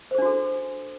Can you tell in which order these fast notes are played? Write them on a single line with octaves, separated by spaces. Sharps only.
C5 G#4 D4 F#4 A4